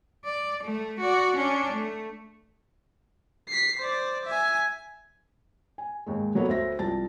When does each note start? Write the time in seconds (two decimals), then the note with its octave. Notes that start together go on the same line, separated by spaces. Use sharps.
0.24 D5
0.64 A3
1.00 F#4 D5
1.36 C#4 D4
1.73 A3
3.48 B6 C7
3.79 C5 D5
4.25 E5 G#5
5.78 G#5
6.06 D#2 G#2 G#3
6.35 F#3 A#3 B3 A4 C#5
6.48 D2 C5 E5 A#6
6.79 C2 F3 A5 A6